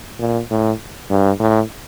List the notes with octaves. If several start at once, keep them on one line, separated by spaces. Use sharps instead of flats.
A#2
A2
G2
A2